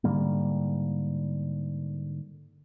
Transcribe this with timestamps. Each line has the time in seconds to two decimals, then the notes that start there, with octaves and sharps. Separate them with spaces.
0.04 G#2 D3 G3 A#3